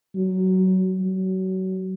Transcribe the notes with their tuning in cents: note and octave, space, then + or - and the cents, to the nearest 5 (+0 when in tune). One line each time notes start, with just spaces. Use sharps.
F#3 +15
F#3 +25